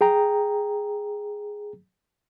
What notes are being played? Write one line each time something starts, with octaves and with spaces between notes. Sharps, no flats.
G#4 G5 A#5